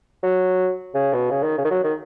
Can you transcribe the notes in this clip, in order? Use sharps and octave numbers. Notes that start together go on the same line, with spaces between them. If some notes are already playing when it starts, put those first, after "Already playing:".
F#3
C#3
B2
C#3
D#3
C#3
D#3
F#3
D#3